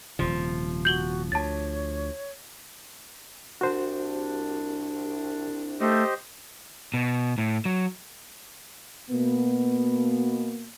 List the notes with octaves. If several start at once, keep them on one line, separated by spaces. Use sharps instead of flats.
D#1 C3 F3
F#4 G6 F#7 G7
D2 C#5 A5 A6
C2 D4 F#4 C5
A3 G4 C5 D#5
B2
A2
F#3
B2 A#3 B3